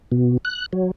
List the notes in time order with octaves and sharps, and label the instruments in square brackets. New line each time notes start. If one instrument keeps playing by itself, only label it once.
[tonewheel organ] B2
F#6
F#3